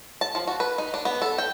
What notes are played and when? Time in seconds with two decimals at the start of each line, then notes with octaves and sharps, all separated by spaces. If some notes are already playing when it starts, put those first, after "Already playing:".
0.21 A5
0.35 F3
0.48 F#4
0.60 B4
0.78 D#4
0.94 D4
1.05 B3
1.22 A4
1.38 G5